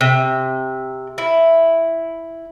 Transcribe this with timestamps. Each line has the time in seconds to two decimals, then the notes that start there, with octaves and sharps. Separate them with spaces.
0.01 C3
1.18 E4